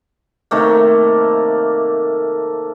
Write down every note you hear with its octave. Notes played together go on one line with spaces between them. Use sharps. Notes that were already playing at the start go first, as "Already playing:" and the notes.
C3 D#3 A3 A#3